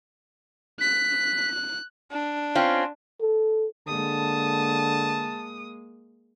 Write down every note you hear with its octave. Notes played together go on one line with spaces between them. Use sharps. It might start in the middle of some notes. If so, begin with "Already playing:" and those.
F#6 B6
D4
C4 C#4 F4
A4
D3 G#3 A#3 A5 D#6